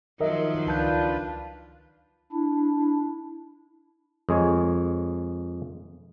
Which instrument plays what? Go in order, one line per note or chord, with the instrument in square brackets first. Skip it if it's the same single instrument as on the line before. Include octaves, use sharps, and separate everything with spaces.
[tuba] D#3 [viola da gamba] F3 F#3 [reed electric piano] A#4 D#5 E5
[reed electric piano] C#2 A5 G6 [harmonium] D4 F4 B4
[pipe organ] D4 E4
[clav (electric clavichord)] F2 G#3 C#5